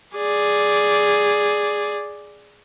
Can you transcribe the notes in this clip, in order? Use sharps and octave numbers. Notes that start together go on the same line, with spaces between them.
G#4 D5